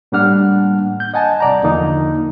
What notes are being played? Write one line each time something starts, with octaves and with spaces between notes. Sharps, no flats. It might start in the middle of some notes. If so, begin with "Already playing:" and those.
A2 G3 A#3 D4 F#5 F6
G6
D#5 F#5 G#5 A5
C2 D5 A#5
E2 D3 F3 A#3 D#4